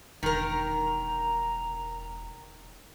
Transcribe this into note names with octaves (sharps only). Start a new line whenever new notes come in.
E1 D#3 A#4 A#5